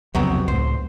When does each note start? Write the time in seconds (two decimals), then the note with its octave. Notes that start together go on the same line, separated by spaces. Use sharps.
0.15 C2 F2 C#3 F#3 B3 C4
0.48 C#2 A2 C5